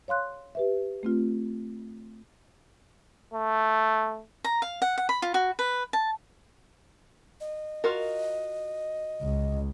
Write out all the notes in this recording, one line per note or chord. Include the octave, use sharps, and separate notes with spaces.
C#5 F5 C6 F#6
G4 B4 E5
A3 C4 F4
A3
A#5
F5
F#5
F#5
B5
F4
F#4
B4
A5
D#5
F4 F#4 A#4
C#2